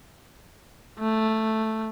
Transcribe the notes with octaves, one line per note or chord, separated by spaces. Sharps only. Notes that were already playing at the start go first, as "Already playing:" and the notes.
A3